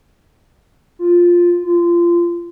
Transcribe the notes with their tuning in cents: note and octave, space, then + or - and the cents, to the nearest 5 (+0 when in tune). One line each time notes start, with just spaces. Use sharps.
F4 +0
F4 -25